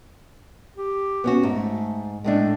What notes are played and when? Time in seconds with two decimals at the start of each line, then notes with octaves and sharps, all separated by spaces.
0.77 G4
1.24 B3 C#4 F#4
1.43 G#2 A3
2.24 A2 G#3 A3 D4